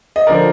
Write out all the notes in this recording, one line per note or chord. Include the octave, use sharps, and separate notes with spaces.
D#5
D3 F3 A#4 D5